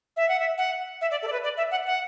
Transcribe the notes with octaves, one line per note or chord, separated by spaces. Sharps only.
E5
F#5
E5
F#5
E5
D5
A4
D5
B4
D5
E5
F#5
F#5